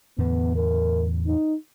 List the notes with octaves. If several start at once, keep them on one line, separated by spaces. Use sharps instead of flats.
E2 A2 D3 B3
A#4
D#4